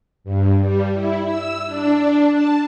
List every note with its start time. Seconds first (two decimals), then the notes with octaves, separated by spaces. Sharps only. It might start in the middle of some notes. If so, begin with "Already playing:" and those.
0.24 G2
0.61 G3
0.94 E4
1.26 E6
1.66 D4
2.31 A5